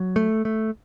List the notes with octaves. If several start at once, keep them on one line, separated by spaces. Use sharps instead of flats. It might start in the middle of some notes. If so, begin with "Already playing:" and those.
Already playing: F#3
A3
A3